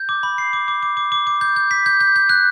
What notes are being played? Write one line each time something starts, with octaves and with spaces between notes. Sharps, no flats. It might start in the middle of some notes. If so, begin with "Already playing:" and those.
Already playing: G6
D6
B5
C7
D6
D6
D6
D6
D6
D6
G6
G6
B6
G6
G6
G6
F#6